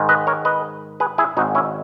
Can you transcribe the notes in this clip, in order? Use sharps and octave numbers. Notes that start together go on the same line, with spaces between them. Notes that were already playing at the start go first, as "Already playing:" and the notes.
Already playing: G#2 D#3 G#3
B4 D#5
A#4 C#5
B4 D#5
G#4 B4
E4 G#4
G#1 G#2 D#3 D#4 F#4
C#4 E4